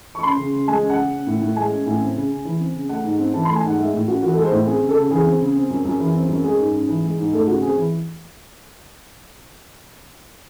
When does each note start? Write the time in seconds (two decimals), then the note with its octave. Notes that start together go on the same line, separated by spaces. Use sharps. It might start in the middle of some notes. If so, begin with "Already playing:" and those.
0.15 C#6
0.23 C#4 C6
0.38 C#3
0.53 C#3
0.68 G#3 G#5
0.83 C#4
0.90 F#5
0.97 C#3
1.12 C#4
1.27 A2
1.41 A2
1.56 G#3 G#5
1.71 C#4
1.86 A2
2.01 C4
2.15 C#3
2.30 C#3
2.45 E3
2.60 C4
2.74 C#3
2.89 A3 F#5
3.04 G#2
3.19 C4
3.33 E3 A5
3.45 A3 C6
3.56 G#5
3.64 G#2 F#5
3.78 G#3 E5
3.93 A2
4.08 C#4 F#4
4.22 E3 F#4
4.33 G#3 A4
4.45 C5
4.52 A2
4.66 C4 G#4
4.81 C#3
4.89 A4
4.97 C#3
5.11 E3 G#4
5.26 C4
5.41 C#3
5.55 C4
5.70 F#2
5.85 F#2
6.00 E3
6.14 C4
6.29 F#2
6.44 G#3 G#4
6.59 G#2
6.74 C#4
6.88 E3
7.03 G#3
7.18 G#2
7.32 A3 A4
7.47 C#3 F#4
7.62 C4 G#4
7.77 E3